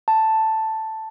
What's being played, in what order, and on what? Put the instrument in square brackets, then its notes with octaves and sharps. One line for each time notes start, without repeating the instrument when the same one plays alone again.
[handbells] A5